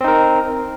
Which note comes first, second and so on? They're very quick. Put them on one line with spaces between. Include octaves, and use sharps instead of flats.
C4 D#4 A#4